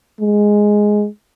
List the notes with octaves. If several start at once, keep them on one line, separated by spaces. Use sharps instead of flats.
G#3